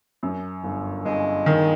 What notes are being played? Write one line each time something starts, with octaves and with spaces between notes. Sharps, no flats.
F#2
G1
G1 G#3
D#3